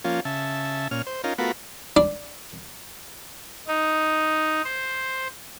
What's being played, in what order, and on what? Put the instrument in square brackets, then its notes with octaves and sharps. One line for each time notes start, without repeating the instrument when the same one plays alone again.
[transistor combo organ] F3 A#3 C#4 F4
C#3 E5 A5
A#2 C#4 F6
C5
C#4 D#4 F4 A#4
A3 B3 F4 F#4 A#4 B5
[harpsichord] D4
[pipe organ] D#4
C5